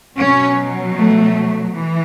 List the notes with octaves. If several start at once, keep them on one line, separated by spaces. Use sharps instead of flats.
B2 F#3 C#4
A3
E3